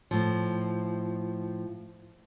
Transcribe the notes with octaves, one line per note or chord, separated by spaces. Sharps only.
A2 F3